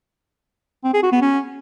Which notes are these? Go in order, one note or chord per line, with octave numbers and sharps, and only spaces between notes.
C4
G#4
F#4
B3
C#4